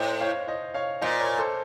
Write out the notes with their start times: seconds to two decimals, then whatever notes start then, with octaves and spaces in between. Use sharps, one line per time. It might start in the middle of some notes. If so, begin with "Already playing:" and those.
Already playing: A2 C5 D#5
0.20 C#5 F5
0.47 C5 D#5
0.74 C#5 F5
1.01 A#2 C5 D#5
1.21 A#4 C#5
1.38 A4 C5